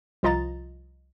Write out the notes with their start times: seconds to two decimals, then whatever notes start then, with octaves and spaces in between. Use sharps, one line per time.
0.23 C2 F3 F4 D#5 A#5 A6